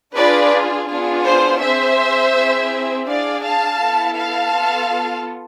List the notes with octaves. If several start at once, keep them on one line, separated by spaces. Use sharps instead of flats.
D4 F4 G#4 B4 D5
B3 D4 F4 G#4
C5
C4 G#4 C5 E5
C4 E4 G#4
D4 G#4 D5 F5
F5 A5
B3 E4 A4
F5 A5
B3 F4 A4